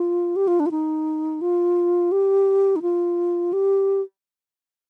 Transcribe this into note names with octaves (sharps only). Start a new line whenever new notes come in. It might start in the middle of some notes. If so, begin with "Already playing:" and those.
Already playing: F4
G4
F4
D4
F4
D#4
F4
G4
D#4
F4
G4